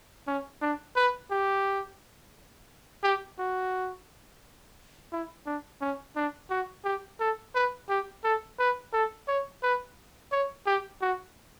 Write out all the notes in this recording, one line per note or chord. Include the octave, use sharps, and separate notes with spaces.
C#4
D4
B4
G4
G4
F#4
E4
D4
C#4
D4
F#4
G4
A4
B4
G4
A4
B4
A4
C#5
B4
C#5
G4
F#4